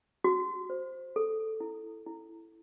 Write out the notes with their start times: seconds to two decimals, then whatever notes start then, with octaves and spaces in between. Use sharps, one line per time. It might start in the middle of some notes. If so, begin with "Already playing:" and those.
0.24 F#4
0.70 C5
1.16 A4
1.60 E4
2.06 E4